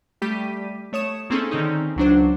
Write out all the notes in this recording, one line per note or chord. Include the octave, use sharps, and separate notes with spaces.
G3 A3 G4 B6 D#7
A3 C#5 D#6 E7
A#3 C4 C#4 D#4 G#4 A4
D3 D#3 C4 C#4 D#4
C#2 F#3 D4 C5